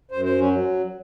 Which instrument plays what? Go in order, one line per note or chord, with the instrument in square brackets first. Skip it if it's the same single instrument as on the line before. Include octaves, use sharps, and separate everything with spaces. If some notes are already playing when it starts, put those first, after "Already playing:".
[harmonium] F#2 C5
C5
F#3 C#4